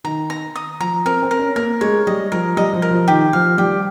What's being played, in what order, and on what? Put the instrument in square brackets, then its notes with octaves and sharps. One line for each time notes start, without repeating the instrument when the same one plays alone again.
[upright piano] D#3 [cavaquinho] A#5
[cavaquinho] A#5
D#6
[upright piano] F3 [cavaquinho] A#5
[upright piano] C4 [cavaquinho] A#4
[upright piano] C4
[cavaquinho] A#4
[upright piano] C#4
[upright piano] A#3 [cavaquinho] A#4
[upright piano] G#3 [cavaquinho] C#5
[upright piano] G3 [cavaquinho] D#5
[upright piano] F3 [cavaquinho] A#4
[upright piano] G3 [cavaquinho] D#5
[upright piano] F3
[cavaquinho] A#4
[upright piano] F3
[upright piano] D#3 [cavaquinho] G4
[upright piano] F3 [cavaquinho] F5
[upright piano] G3 [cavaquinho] G4